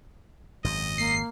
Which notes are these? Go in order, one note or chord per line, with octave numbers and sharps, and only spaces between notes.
G#1 F#2 D#5
A#3 C7